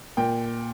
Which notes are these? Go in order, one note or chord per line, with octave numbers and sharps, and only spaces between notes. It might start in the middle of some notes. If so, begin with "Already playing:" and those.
A#2 G5